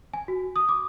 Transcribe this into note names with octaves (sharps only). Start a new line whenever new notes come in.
G#5
F#4
D#6
D6